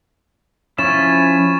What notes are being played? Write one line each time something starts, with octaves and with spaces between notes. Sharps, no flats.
F3 C#4 E4 C#6 A6 E7